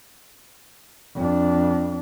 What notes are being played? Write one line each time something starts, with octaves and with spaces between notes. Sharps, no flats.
F2 D4